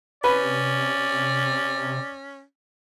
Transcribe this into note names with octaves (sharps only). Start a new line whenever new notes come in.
C3 C#4 B4 D5